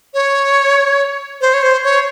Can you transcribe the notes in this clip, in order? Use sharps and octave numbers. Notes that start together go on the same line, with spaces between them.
C#5
C5
C#5
C5
C#5